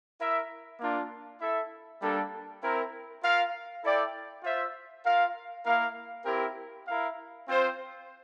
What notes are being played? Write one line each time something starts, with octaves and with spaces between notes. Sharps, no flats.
E4 A#4 E5
A#3 D4 F4
E4 A4 E5
G3 A#3 D4 A4
C4 E4 A#4
F4 A#4 F5
E4 A4 D5 G5
F4 C5 E5
F4 A#4 F5
A#3 E4 A#4 F5
C4 E4 G4 A#4
E4 A#4 F5
C4 F4 C5